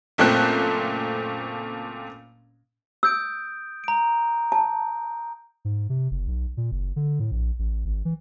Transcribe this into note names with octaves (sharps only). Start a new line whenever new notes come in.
F#1 A#2 A3 C4 F#6
D#6 E6 G6 D7
A#5 D7
A5
G#2
C3
F#1
B1
A#2
F#1
D3
A2
A#1
A1
G#1
E3